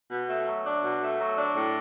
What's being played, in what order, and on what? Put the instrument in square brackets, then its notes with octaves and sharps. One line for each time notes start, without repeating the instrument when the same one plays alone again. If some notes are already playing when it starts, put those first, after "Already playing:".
[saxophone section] B2
A3
F#3
D4
B2
A3
F#3
D4
A2